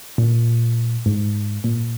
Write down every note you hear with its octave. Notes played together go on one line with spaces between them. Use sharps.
A#2
G#2
A#2